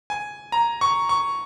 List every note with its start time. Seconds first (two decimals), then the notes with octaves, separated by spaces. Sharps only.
0.10 G#5
0.52 A#5
0.81 C#6
1.09 C#6